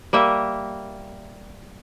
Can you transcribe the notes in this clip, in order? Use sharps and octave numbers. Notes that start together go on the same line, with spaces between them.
G3 A#3 E5